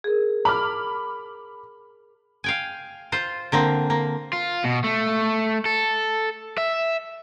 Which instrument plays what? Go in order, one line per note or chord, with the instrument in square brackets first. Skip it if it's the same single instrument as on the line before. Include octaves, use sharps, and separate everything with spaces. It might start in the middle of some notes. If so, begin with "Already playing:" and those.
[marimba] G#4 A#4
[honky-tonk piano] B5 D6 F6
[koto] F5 G5 G#5
F4 C5
D3 A#3 C4
A#3
[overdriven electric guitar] F4
B2
A3
A4
E5